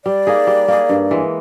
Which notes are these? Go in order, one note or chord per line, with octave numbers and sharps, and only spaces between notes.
G3 D5
A#3 D#4 G#4
G3
A#3 D#4 G#4
G2
E3 G#3